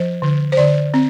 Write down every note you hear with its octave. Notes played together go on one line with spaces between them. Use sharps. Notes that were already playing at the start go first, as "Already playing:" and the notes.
Already playing: F3 C5
D3
C5
D3 D5
C4